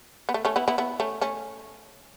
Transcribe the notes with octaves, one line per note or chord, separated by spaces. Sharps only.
B3
A3
A3 C#4
B3 E4
B3 E4
B3 E4
A3 C#4
A3 C#4